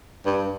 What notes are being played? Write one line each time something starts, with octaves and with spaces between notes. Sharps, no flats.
G2